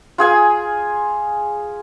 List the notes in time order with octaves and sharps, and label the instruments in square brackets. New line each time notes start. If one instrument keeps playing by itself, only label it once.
[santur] F4 G#4 G#5